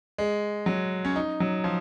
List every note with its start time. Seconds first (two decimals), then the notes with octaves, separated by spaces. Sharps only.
0.18 G#3
0.66 F#3
1.05 C#4
1.16 D#4
1.40 F#3
1.64 F3